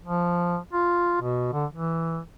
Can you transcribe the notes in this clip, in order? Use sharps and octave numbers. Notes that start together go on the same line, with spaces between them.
F3
F4
B2
D3
E3